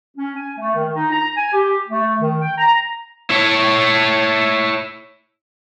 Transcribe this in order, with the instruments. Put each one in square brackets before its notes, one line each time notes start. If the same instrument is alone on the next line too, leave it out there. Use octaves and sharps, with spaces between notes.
[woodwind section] C#4
G#5
A3
D#3
D#4
A#5
G#5
G4
A3
D#3
G5
A#5
[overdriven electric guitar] E4 C#5